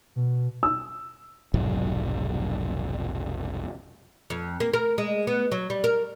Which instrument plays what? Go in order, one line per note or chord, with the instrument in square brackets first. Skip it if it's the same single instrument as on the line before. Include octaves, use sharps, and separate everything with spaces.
[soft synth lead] B2
[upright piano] E6
[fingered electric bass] F1 B1 G#2 F#3
[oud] F2
A#3
A#4
G#3
B3
F#3
G3
A#4